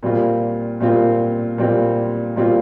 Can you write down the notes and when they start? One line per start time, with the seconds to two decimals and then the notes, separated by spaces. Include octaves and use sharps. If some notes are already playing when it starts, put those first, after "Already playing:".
0.03 A#2 G3 C4 F4
0.80 A#2 G3 C4 F4
1.58 A#2 G3 C4 F4
2.36 A#2 G3 C4 F4